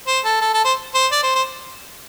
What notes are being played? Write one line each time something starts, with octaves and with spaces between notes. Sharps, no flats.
C5
A4
A4
A4
C5
C5
D5
C5
C5